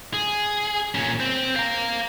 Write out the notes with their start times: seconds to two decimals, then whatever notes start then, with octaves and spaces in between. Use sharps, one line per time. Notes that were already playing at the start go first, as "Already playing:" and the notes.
0.14 G#4
0.95 A#2 C#4
1.20 C4
1.56 F5 A#5